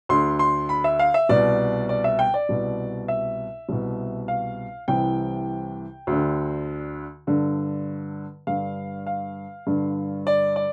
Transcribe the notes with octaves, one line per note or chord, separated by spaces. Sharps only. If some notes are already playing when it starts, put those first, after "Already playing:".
D2 D3 C6
C6
B5
E5
F5
E5
C2 B2 D5
D5
E5
G5
D5
C2 B2
E5
C2 B2
F5
C2 C3 E3 G5
D2 D3
G2 D3
G2 D3 F5
F5
G2 D3
D5
D5